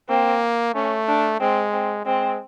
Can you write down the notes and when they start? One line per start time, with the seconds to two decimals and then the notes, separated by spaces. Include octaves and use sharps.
0.09 A#3 C4
0.75 A3 C#4
1.08 D4
1.40 G#3 C4
1.72 C4
2.05 G#3 C4